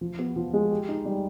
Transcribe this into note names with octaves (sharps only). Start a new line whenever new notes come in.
F3
B3
F3
G#3
G4
D#4
G3